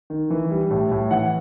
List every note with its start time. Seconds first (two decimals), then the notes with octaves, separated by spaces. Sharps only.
0.10 D#3
0.30 E3
0.51 G3
0.71 A2
0.91 A2
1.11 E3 F#5